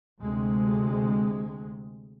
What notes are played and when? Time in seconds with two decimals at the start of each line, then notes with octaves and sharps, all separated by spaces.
0.20 D2 C3 G#3